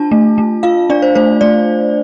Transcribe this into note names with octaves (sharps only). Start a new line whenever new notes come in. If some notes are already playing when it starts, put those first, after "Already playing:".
Already playing: D4 F4 A5
A3
A3
F4 F5
D4 D5
C5
A3 C5
A3 D5